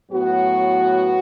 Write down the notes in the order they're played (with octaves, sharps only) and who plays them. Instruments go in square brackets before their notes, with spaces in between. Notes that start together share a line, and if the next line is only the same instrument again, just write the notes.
[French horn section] A2 F#3 B3 F#4